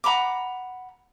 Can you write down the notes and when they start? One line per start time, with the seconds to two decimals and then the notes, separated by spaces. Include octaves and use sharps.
0.04 F#5 A#5 B5 D6